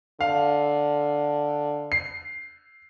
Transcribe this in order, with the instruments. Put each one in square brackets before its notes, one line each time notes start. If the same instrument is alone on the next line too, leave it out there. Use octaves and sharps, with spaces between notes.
[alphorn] D3 [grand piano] F5
[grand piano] C7